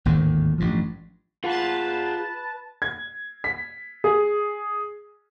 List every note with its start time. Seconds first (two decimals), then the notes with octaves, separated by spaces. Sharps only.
0.05 G#1 D#2 A2 D3
0.58 A1 G2 F3
1.44 F4 G#4 B4 F#5 A5
2.82 G#6
3.44 B6
4.04 G#4